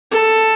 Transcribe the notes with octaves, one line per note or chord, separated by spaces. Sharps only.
A4